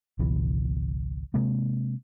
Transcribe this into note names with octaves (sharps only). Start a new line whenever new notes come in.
G#1 C#2 B2 E3
C3 G#3 A#3 C4